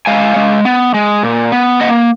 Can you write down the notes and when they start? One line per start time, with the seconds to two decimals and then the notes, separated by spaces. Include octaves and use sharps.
0.06 G#3 F5 G#5
0.36 G#3
0.65 B3
0.94 G#3
1.23 A#2
1.52 B3
1.81 A#3 D#5 F#5